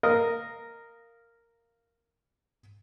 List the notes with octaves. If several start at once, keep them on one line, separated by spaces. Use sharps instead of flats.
A#4 D#5 F5